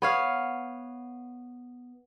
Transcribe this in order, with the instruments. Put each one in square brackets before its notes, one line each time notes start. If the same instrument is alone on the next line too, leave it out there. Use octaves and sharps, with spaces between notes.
[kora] B3 C#5 F5